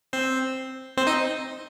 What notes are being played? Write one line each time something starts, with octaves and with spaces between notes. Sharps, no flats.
C4 C5
C4 C5
D#4 D#5